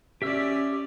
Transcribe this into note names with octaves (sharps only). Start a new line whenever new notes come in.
C#4 G4 D5 E5 E6